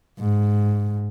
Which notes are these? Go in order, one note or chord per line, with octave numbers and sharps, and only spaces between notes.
G#2